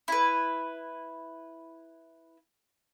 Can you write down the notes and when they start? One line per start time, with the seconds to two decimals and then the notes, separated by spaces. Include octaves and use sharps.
0.08 E4 B4